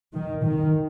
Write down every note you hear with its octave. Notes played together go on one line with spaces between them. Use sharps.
D#3
D#3